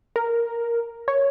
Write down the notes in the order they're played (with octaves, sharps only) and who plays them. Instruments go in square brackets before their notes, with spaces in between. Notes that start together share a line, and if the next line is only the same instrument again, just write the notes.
[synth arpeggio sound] A#4
C#5